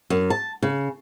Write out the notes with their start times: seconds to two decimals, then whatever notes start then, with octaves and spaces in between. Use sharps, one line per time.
0.10 F#2
0.30 A5
0.63 C#3